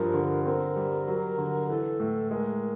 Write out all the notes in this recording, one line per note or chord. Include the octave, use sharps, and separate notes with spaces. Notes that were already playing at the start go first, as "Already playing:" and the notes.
Already playing: G2 F3 A#4
D3
C4 A#4
G3
F#3
D3
E3 A4
A2
G#3 A#4